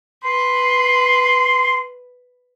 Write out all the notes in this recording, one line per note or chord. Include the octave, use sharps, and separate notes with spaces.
B4 C6